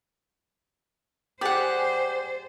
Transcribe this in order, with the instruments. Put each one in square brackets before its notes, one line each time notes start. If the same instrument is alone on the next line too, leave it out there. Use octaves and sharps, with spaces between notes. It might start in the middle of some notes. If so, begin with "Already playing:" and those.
[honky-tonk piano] G4 G#4 [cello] C5 [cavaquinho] D5 F#5